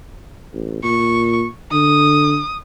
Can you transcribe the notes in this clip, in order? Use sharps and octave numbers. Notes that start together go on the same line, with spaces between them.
A1
A#2 C#6
D3 D#6